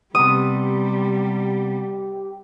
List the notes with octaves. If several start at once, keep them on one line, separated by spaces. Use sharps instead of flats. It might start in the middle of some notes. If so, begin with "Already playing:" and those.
C3 G3 B3 G4 D#6